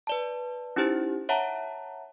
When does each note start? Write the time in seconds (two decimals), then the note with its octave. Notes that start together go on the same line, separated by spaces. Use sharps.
0.07 B4 D5 A5
0.76 C#4 D#4 E4 G4 C5
1.29 C#5 E5 F#5 A5 A#5